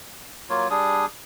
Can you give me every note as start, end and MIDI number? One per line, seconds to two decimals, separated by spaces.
0.50 0.68 54
0.50 0.68 58
0.50 0.68 65
0.50 0.68 73
0.70 1.06 55
0.70 1.06 62
0.70 1.06 68
0.70 1.06 87